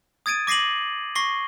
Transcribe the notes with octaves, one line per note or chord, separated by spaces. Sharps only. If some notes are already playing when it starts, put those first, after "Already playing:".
D#6 G#6 A6 D7 D#7
D6 A#6 C7 D#7 F#7
C#6 A#6 C7 G7